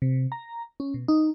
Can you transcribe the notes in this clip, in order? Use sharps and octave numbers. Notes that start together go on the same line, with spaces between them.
C3
A#5
C#4
B2
D#4